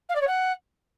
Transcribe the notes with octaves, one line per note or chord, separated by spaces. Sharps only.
F5
D5
C#5
F#5